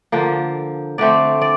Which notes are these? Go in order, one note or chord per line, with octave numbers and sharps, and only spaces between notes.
D3 F3 A#3
D3 A3 C4 D5
D5